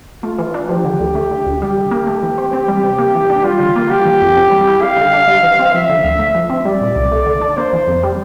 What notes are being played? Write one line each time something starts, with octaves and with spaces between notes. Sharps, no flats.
A3 F4
E3
D4
F3 G4
D3
D2
A3
D3
D2
G3 G4
D3
A#3
A3
E3
C4
C4
G3
C3
A#3
E3
D4
G3 F4
D3
A#3
G3 G4
E3
F2
C4
G3
E4
G3 F5
D3
D4
G3
E3
C4
F3 E5
D3
D2
A3
F3
C4
G3 D5
A#2
C2
A3
D3
D4
A#3 C5
E3
F2
G3